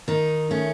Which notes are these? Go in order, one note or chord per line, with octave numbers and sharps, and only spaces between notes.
D#3 D#4
A3 C#4